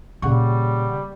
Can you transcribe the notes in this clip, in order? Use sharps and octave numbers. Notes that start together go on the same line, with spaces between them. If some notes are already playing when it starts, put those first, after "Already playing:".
A#2 C#3 G3 F#5 C#6